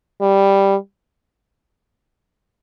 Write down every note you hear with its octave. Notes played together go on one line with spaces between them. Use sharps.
G3